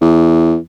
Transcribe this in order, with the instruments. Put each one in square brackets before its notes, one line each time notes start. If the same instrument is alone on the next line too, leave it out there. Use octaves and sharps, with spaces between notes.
[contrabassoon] E2